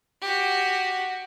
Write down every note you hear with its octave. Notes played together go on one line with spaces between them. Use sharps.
F#4 G4